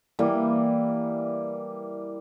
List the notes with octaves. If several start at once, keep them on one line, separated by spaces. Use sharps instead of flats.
E3 G3 A#3